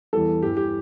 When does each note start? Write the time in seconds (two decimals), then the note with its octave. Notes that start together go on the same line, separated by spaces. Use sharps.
0.13 E2 E3 G3 A4
0.42 G2 E3 G3 G4
0.57 G4